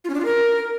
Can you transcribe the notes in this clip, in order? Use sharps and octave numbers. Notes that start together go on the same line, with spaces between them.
F4
C#4
D4
F4
A#4